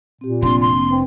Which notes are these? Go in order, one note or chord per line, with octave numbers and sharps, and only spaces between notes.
A#2 C4 G4
F1 A#3 C4 D4 C6
C6
C4 B4